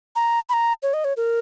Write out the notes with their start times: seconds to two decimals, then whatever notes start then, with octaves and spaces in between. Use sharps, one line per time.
0.16 A#5
0.49 B5
0.53 A#5
0.83 C#5
0.94 D#5
1.04 C#5
1.17 A#4